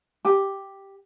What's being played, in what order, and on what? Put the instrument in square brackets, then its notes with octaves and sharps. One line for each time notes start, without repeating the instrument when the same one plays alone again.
[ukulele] G4